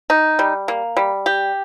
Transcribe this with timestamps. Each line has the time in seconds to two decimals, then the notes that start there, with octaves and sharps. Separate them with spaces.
0.10 D#4
0.39 G3
0.68 A#3
0.97 G3
1.26 G4